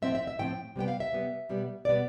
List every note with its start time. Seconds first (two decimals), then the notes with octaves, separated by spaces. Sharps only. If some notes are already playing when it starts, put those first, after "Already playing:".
0.02 A2 F3 C4 E5
0.15 E5
0.27 E5
0.39 A2 F3 C4 G5
0.76 C3 G3 B3 G5
0.88 F5
1.00 E5
1.12 C3 G3 B3
1.49 B2 G3 B3
1.85 B2 G3 B3 D5